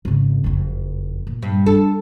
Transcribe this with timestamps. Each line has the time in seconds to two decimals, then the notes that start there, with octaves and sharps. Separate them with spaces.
0.05 G#1 C#3
0.44 F#1 F2
1.27 A#2
1.43 G2
1.66 D4 A4